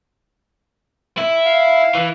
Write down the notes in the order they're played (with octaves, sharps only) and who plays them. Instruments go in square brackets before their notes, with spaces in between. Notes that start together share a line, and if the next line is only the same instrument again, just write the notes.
[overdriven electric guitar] E4
[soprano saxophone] F5
[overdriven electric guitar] E3